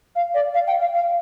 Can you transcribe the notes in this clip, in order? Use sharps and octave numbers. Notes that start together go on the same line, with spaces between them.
F5
D5
F5
G5
F5
F5